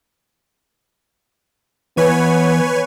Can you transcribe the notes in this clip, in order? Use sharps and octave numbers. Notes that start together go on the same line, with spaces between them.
E3 B3 B4 C#5 G#5